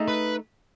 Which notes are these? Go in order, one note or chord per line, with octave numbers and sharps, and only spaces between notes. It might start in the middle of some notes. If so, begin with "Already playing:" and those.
Already playing: A3 D#4 G#4 D#5
B4